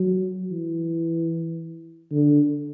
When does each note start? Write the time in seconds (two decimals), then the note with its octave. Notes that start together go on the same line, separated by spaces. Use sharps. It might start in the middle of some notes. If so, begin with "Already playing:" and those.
Already playing: F#3
0.51 E3
2.12 D3